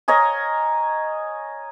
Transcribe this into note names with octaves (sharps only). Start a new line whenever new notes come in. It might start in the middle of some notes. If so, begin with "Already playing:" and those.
A#4 C#5 D#5 G#5